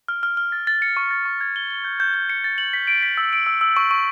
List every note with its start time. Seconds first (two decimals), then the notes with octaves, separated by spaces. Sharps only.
0.08 F6
0.23 F6
0.37 F6
0.52 A6
0.67 A6
0.82 C#7
0.97 C#6
1.11 A6
1.25 C#6
1.41 G#6
1.56 G7
1.70 G7
1.85 G6
2.00 G6
2.14 G6
2.29 C#7
2.44 A6
2.58 F#7
2.73 B6
2.87 D7
3.03 B6
3.17 E6
3.33 D7
3.47 E6
3.61 E6
3.77 C#6
3.91 C#6